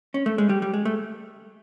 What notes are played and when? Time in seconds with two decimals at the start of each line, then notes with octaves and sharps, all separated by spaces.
0.14 C#4
0.26 A3
0.38 G#3
0.49 G3
0.62 G3
0.74 G#3
0.85 A3